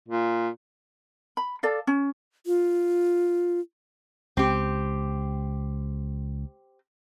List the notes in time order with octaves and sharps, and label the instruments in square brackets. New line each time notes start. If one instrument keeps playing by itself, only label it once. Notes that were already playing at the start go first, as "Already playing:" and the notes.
[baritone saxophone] A#2
[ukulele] B5
A4 D5 F5
C#4
[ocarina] F4
[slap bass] C#2 [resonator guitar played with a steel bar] C4 G4